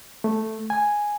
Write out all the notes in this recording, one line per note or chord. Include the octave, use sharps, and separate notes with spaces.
A3
G#5